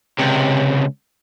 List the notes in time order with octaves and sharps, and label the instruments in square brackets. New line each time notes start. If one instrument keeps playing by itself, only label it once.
[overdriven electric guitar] C#2 C3